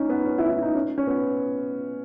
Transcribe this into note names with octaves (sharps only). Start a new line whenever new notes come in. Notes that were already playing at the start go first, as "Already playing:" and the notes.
Already playing: C#4 D#4
B3
C#4
E4
E4
D#4
C#4
C#4
B3